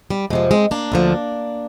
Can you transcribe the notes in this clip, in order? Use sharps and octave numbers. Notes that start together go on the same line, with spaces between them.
G3
F2 C3 F3 G#3
G#3 C4
A#3 D4
D2 D3 F3